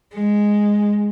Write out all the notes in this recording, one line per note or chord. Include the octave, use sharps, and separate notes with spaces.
G#3